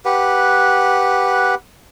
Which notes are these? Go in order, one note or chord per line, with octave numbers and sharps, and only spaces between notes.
G4 B4 F#5